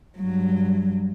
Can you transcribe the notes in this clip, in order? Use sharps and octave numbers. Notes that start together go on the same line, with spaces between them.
G2 F#3